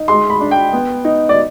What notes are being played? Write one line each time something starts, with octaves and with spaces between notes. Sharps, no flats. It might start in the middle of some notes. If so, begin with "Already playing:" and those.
Already playing: D#4
G#3 C6
B5
D4
G5
B3
D#4
D5